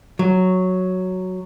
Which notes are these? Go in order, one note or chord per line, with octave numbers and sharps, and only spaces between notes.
F#3